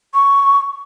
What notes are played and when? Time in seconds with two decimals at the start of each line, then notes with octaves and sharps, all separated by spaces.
0.14 C#6